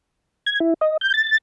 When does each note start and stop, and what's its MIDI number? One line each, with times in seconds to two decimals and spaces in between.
0.47 0.59 92
0.60 0.74 64
0.81 0.97 75
1.01 1.12 91
1.14 1.38 93